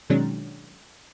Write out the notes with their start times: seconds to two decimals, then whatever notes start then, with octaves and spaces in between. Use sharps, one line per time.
0.10 B2 D#3 F#3 G#3 C#4 D4